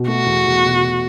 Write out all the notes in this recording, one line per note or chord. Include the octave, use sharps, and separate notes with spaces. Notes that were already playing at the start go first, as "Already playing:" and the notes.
Already playing: B2
A3 F#4
E2
E2
B2
B2